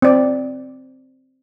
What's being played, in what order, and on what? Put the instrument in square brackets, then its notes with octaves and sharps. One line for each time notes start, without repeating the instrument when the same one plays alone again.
[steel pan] C4 D5